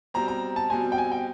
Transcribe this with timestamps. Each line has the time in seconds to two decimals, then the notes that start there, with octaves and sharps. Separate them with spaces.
0.14 B2 G3 C4 A#5
0.28 A#5
0.56 A5
0.70 B2 G3 C4 G#5
0.92 G5
0.98 G#5
1.12 G5